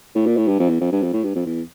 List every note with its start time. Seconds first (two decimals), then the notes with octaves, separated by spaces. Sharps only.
0.15 A2
0.26 A#2
0.37 A2
0.47 G2
0.59 F2
0.69 E2
0.81 F2
0.92 G2
1.02 F2
1.13 A2
1.24 G2
1.36 F2
1.46 E2